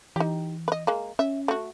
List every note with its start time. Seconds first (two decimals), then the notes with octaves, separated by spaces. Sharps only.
0.16 E3 D#4 G4
0.68 B4 D#5
0.87 G#3 A#3
1.19 C#4 E5
1.48 A3 F#4